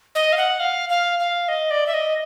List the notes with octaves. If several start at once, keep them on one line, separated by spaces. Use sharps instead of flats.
D#5
F5
F#5
F5
F5
F5
D#5
D5
E5
D#5